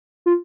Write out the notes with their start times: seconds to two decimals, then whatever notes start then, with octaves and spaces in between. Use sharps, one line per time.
0.26 F4